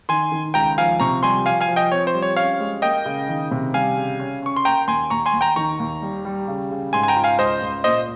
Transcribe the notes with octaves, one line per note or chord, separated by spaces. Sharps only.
D#3 G#5 C6
D#3
C#2 G5 A#5
F3 F5 G#5
C3 A#5 C#6
G3 G#5 C6
F3 F5 G#5
F5 G#5
F3
D#5 G5
C4 C#5
C5
G3
C#5
C#4 C#5 F5
G#3
A#3 D#5 G5
C#3
D#3
C3
G3 F5 G#5
C#3
C#4
C#4 C#6
C6
A#3 G5 A#5
D#2 G#5 C6
D#2 A#5 C#6
G#5 C6
D#2
G5 A#5
D#3 A#5 C#6
D#2
G3
G3
C#3
C#3
G#2 G#5 C6
G#5
G5 A#5
F4
F5 G#5
C#2 C5 D#5
C#2
A#2 C5 D#5